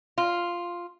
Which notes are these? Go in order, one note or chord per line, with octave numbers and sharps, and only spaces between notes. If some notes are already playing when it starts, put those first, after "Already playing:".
F4